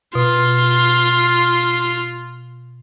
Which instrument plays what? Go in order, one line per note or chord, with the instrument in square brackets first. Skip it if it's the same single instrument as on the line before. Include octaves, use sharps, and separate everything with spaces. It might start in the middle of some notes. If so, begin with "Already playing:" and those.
[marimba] B2 [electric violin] F4